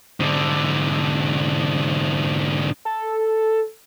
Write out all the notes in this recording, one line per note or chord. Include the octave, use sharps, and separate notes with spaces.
G#2 D3
A4